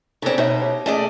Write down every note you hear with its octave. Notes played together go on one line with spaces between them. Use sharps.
C#3 C4 D#4 A4 D5
B2 D#4 C#5 E5
G4 C#5
A3 C#4 G#4 D5 D#5